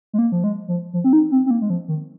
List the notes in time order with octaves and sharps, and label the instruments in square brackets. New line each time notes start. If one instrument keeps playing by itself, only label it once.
[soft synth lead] G#3
A#3
F3
G#3
F3
F3
C4
D#4
C4
C4
A#3
G#3
F3
D#3